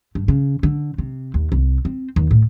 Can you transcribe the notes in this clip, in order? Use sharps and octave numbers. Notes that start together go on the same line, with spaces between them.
G2
C#3
D3
C3
D#2
C2
C4
D#2
A2